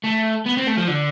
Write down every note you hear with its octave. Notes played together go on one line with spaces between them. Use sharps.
A3
B3
C4
A3
F3
D3